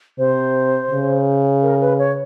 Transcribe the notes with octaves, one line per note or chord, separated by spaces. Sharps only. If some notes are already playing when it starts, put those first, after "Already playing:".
C3 C5
C#3
A#4
B4
C#5